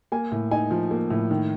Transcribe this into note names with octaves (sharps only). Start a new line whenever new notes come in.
A#3 G#5
A2
D#4 G#5
F3
A#3
A2
D#3